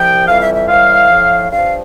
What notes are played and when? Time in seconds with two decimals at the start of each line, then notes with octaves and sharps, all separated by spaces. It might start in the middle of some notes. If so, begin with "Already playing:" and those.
Already playing: C2 C3 F3 G5
0.27 F2 E3 G3 F5
0.41 E5
0.54 E5
0.68 A2 E3 G3 F5
1.10 A2 F3
1.52 G2 F3 F5